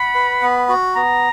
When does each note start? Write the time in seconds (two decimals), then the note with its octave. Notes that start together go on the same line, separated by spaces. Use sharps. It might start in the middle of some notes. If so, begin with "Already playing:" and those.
Already playing: F#5 B5
0.15 B4
0.42 B3
0.69 F#4
0.95 B3 A#5